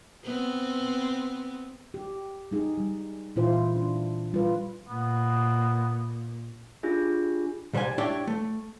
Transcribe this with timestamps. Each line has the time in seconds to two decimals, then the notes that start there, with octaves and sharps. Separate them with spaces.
0.24 B3 C4
1.94 G4
2.51 G#3 D#4 G#4
2.77 G3
3.36 A#2 E3 E4 F4 C5
3.76 D4
4.32 G3 F4 B4
4.89 A#2 B3
6.83 D4 F4 G4 G#4
7.73 B1 G3 C5 F#5 G#5
7.98 D4 E4 G4 C#5 D5 G5
8.27 A3